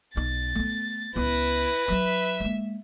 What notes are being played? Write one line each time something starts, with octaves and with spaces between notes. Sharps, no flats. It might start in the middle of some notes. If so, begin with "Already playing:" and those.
B1 D#4 A6
A3 B3
C#2 B3 E4 B4 A#6
F#3 D#4 E5
G#3 A#3